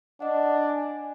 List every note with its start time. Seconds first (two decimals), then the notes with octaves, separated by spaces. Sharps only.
0.20 D4 D#5 F#5
0.69 G#5